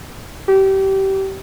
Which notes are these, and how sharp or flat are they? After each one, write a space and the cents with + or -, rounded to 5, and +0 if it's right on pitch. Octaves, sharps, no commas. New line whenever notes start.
G4 -25